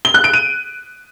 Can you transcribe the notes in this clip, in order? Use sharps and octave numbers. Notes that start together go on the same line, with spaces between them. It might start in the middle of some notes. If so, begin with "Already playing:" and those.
G7
F#6
D7
D#7